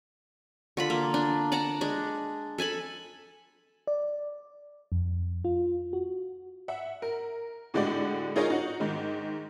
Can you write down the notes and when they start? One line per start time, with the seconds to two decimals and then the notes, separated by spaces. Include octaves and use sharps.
0.77 D3 F4 B5
0.90 A#3
1.14 D4
1.52 D5 F#5 A5 A#5
1.81 G#3 D4
2.58 A4 G#5 A5 B5
3.87 D5
4.92 F2
5.45 F4
5.93 F#4
6.68 E5 F#5
7.02 A#4
7.74 A2 D3 G#3 F#4 G4 D5
8.36 D#4 F4 G#4 A#4 C#5 D#5
8.50 D#4 F#4
8.80 G#2 D#3 G#3